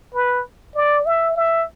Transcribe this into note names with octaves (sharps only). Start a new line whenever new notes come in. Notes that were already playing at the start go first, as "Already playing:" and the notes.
B4
D5
E5
E5